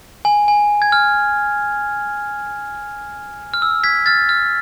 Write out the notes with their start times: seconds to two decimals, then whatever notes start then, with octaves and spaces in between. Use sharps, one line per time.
0.25 G#5
0.48 G#5
0.82 G#6
0.92 F6
3.54 F6
3.62 E6
3.84 G#6 B6
4.06 F6 A6
4.29 F6